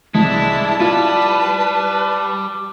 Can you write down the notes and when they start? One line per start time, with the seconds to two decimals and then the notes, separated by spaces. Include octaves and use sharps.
0.14 C2 G#3 D4 E4 A5
0.80 G3 E4 F4 B4